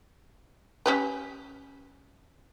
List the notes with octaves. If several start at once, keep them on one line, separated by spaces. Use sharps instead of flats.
C#4 G4 B4